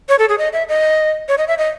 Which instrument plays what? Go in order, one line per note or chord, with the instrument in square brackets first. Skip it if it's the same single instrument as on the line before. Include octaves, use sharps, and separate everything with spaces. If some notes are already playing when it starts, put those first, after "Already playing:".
[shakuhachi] C#5
A4
G#4
D#5
E5
D#5
C#5
D#5
E5
D#5